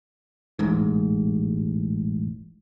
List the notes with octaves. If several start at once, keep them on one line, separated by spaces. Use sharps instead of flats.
E1 A1 G#2